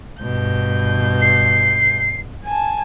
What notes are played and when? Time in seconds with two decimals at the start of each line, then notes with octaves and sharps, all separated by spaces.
0.22 G2 B2 G6
1.21 C7
2.44 G#5 A5